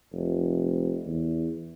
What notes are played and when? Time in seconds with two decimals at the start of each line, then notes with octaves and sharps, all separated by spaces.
0.13 F1
1.06 E2